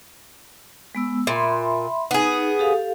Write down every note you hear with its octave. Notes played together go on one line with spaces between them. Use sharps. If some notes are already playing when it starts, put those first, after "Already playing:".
G#3 B3 E6
A#2 E5 B5 C6
B3 D#4 G#4
G4 A4 F5